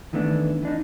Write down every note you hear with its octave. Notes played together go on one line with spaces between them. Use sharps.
D#3 E3 A3 B3 C#4 D4
E3 D4 D#4